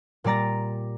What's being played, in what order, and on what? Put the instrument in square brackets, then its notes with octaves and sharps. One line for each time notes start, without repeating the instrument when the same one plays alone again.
[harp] A#2 G3 D5 A#5 A6